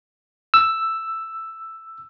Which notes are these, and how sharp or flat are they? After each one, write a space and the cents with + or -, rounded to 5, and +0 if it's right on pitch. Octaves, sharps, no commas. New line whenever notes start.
E6 +5